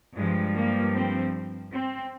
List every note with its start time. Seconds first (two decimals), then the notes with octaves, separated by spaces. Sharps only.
0.15 G2 F3 G#3
0.55 A#3
0.94 C4
1.73 C4